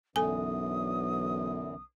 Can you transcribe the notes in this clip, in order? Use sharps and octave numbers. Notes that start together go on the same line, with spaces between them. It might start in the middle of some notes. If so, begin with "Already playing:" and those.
B1 F#2 D3 E3 A4 G#5 D#6